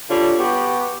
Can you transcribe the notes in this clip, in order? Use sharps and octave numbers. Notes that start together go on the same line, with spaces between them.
D3 G3 F4 C#5
B3 F#4 G4